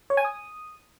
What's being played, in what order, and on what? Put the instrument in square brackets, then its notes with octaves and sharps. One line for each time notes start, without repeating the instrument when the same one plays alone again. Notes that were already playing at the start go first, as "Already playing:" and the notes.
[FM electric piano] C#5
G#5
D#6